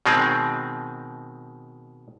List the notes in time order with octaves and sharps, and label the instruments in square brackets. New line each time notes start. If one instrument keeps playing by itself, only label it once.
[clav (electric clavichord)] B2 D#3 G#3 C4